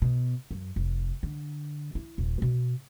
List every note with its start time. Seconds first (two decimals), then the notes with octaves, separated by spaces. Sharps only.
0.02 B2
0.51 F#2
0.76 F1
1.23 D3
1.95 E4
2.18 D#1
2.42 B2